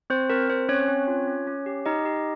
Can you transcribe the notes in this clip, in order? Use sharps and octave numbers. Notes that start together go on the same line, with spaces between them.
C4 C5
C4 A#4
C4 C5
C4 C#4 C#5
C4
F4
C#4
C#4
G4
D#4 G4 D#5
G4